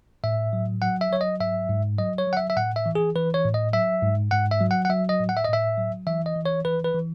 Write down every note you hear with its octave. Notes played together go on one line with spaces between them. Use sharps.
A2 E5
F#3
F#3 F#5
E5
F#3 C#5
D#5
G#2 E5
G#2
F#3 D#5
C#5
F#3
F#5
E5
E5
A2 F#5
E5
E3
G#4
E3 B4
C#5
A2
D#5
F#3 E5
G#2
G#2 F#5
E5
F#3
F#5
F#5
F#3 E5
D#5
A2
F#5
E5
D#5
A2 E5
F#3
E3 E5
D#5
E3
C#5
E3 B4
B4
E3